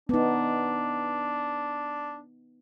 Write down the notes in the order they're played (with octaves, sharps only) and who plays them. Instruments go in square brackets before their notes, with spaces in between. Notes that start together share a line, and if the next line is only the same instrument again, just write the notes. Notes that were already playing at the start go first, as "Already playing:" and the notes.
[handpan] B3 D#4 [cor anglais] D4